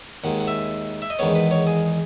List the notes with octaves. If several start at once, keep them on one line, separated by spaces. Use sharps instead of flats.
D#2 D#3 G#3 F#5
F#5
E5
E5
D#5
E2 D#3 G#3 B3 C#5
B4
C#5
G#4